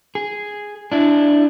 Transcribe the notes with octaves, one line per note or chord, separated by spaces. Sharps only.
G#4
D4 E4